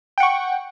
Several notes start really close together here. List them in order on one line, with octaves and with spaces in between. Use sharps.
G5 F#5 C#6